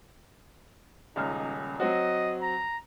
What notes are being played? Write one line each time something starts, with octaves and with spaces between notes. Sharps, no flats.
D#1 C#2 D#4 F6
F#3 C4 F#4 D#5
A#5